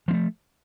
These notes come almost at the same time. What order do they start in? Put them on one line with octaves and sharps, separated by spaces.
F3 B3 A3